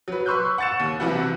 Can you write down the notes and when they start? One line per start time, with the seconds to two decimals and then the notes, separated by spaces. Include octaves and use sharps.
0.08 F#3 B4
0.26 B4 C6 C#6 E6 F#6 G6
0.58 F#5 C#6 A6 C#7 E7
0.80 D#2
1.00 B1 C3 E3 E4 F#4 F#5